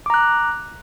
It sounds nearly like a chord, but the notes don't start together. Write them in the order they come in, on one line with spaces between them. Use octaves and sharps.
D6 A#5 F#6